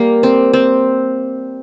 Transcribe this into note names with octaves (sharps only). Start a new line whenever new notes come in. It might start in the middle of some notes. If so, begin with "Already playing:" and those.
Already playing: G3 A#3
C4
C4